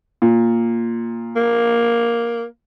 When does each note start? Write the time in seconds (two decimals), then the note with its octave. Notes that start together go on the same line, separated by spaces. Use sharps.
0.22 A#2
1.36 A#3